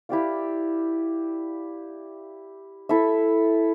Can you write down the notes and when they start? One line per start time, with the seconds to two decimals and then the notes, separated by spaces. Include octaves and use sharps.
0.09 E4 G4 D5 F5
2.89 E4 A4 E5